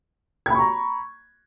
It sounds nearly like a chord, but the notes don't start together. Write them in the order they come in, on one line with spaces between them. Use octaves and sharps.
G#6 B5 C#6 A#5